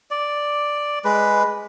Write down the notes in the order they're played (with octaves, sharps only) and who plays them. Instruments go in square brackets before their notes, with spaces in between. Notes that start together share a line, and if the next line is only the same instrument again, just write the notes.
[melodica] D5
G#3 B4